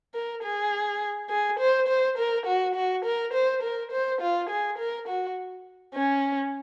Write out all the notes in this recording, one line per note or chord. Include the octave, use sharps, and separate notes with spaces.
A#4
G#4
G#4
C5
C5
A#4
F#4
F#4
A#4
C5
A#4
C5
F4
G#4
A#4
F#4
C#4